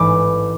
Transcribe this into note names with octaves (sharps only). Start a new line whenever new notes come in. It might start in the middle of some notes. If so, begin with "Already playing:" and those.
Already playing: A1 G#2 E3 B5 D6